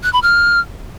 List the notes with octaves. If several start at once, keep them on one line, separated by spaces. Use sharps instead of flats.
F#6
B5
F6